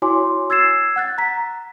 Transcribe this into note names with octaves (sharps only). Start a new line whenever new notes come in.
E4 F#4 C#5 G#5 C6 D6
E6 G#6 A6 C7 E7
F#5 F#6 A6
A#5 B6